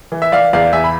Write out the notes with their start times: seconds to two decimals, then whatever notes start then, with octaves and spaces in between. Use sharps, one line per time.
0.12 E3
0.22 E5
0.32 E3 D5 F5
0.53 E2 D5 F5
0.73 E2 E5 G#5
0.84 B5